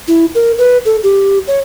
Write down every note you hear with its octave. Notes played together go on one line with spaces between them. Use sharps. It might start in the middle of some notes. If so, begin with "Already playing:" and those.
E4
A#4
B4
A4
G4
C#5